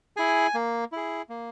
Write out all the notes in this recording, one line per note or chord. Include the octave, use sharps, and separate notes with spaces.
E4 G#4 G#5
A#3
E4 G#4
A#3